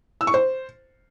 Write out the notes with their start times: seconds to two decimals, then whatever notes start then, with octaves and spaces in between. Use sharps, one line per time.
0.21 E6
0.27 C#6
0.34 C5